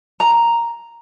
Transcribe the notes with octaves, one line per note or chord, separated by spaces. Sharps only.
A#5